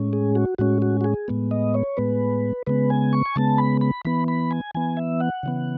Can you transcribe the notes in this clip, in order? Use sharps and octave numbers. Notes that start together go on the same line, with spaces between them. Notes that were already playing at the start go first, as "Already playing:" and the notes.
Already playing: A2 G#3 C#4
G#4
F#4
A2 G#3 C#4 F#4
F#4
F#4
G#4
A2 G#3 B3
D#5
C#5
A2 G#3 B3 B4
C#3 G#3 B3 B4
G#5
C#6
G#5
C#3 G#3 B3 A5
B5
B5
E3 B3 B5
B5
G#5
E3 B3 G#5
E5
F#5
C#3 E3 B3